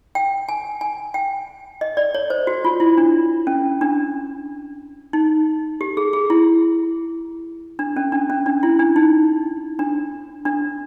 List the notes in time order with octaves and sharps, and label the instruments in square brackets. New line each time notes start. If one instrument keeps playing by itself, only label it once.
[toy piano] G5
G#5
G#5
G5
D#5
D5
C#5
C5
F#4
F4
E4
D4
C#4
D4
D#4
G4
G#4
G#4
E4
D4
C#4
D4
C#4
D4
E4
D4
D#4
D4
D4